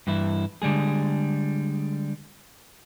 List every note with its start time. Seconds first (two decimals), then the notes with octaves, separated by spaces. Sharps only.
0.07 G2 E3 E4
0.62 D3 G3 G#3 G#4